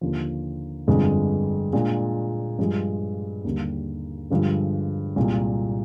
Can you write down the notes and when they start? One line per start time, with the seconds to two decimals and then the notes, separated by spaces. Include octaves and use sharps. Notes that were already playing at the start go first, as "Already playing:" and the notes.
0.01 D#2 D3 F3
0.87 G1 F2 D3 G#3
1.73 A#2 G#3 D4
2.58 G2 F3 G#3
3.44 D#2 D3 G3
4.30 G2 D3 F3 G#3
5.16 C2 A#2 G#3